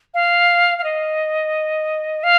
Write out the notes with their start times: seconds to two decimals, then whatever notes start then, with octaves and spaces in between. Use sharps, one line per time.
0.14 F5
0.78 F5
0.84 D#5
2.23 F5